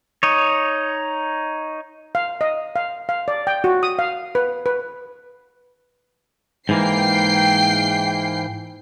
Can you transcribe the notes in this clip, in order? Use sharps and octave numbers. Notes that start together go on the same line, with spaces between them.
D#4 C#5
F5
D#5
F5
F5
D5
G5
F#4
D#6
F5
B4
B4
G#2 E3 A#3 G5 C7